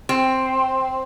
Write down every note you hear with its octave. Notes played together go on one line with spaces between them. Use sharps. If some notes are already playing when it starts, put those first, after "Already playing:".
C4